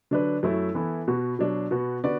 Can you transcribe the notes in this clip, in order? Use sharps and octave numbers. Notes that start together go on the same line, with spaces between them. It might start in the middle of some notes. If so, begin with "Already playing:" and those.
D3 F#3 D4 B4
F#2 F#3 A3 E4
E3 B3 E4 A4
B2 B3 F#4
B2 F#3 D4
B2 B3 F#4
D3 B3 F#4 B4 D5